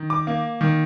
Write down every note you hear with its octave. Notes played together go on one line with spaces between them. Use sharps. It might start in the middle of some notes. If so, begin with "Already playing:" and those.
Already playing: D#3
D6
A#3
D#3